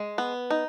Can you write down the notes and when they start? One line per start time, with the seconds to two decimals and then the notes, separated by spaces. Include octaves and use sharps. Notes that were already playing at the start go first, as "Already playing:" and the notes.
Already playing: G#3
0.18 B3
0.50 D#4